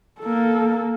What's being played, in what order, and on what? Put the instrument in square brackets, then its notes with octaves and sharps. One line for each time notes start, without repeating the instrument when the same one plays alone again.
[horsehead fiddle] A#3 A4